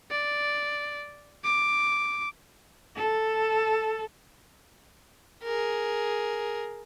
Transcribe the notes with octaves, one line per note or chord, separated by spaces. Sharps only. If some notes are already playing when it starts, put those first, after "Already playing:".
D5
D6
A4
G#4 A#4